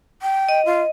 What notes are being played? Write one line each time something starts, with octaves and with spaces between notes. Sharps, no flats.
G5
D#5
F4